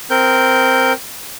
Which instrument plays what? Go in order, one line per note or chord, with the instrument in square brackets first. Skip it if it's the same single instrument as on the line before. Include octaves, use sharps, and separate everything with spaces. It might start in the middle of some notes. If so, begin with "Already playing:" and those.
[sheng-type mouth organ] C4 A#4 G6